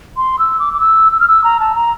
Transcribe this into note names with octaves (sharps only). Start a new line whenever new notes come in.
C6
E6
D6
D6
E6
E6
F6
E6
A#5
A5
A#5